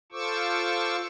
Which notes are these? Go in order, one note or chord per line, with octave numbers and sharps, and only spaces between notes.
F4 A4 C5 C#6 D6 E6